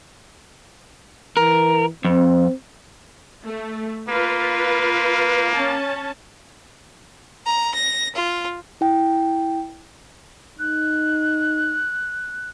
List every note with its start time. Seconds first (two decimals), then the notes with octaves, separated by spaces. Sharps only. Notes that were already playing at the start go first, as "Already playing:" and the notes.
1.37 E3 A#4
2.05 F2 C4
3.45 A3
4.09 A#3 F4 B4
5.55 C#4 A5
7.44 A#5
7.73 A#6
8.14 F4
8.81 E4 G5
10.59 D#4 F#6